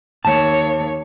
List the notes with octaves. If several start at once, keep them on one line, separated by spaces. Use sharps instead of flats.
D#2 C#5 A5